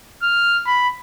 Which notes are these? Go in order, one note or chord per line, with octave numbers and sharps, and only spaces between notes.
F6
B5